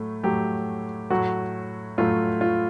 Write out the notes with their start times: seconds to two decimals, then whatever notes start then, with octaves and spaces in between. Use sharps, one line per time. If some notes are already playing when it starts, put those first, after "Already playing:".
Already playing: A2 F#3 A3
0.23 A2 F#3 A3 G4
1.10 A2 F#3 A3 F#4
1.98 A2 F#3 A3 F4
2.41 F4